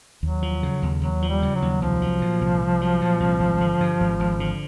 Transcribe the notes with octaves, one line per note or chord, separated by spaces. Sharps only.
D#2 F#3
F3
C#3
D#2
D#2 F#3
F3
G3
C#3
F#3
D#2
C2 F3
F#3
A#2
C2
C2
F#3
A#2
C2
G#1
D3
G2
G#1
G#1
D3